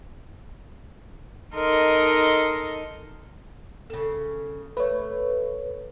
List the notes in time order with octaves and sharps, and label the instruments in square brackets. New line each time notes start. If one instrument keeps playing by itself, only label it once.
[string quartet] D#4 A4 A#4 D#5 C6
[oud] C#3 A4
[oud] A3 [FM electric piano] B4 C#5